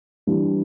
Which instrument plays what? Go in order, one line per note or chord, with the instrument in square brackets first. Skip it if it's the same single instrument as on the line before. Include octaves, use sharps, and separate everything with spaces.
[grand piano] E3 G3 D4